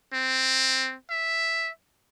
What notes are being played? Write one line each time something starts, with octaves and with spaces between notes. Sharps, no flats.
C4
E5